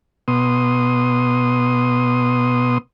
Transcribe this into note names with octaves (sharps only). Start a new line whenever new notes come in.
B2 B3 C6 D#6